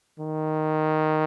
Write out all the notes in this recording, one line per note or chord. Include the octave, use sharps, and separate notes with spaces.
D#3